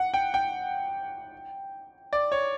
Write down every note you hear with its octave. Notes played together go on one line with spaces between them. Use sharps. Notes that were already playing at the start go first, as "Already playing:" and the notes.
Already playing: F#5
G5
G5
D5
C#5